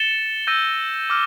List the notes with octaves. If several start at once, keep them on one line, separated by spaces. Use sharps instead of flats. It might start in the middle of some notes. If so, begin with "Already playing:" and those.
Already playing: A6 C#7 E7 G7
E6 G6 A#6 D#7
D6 F6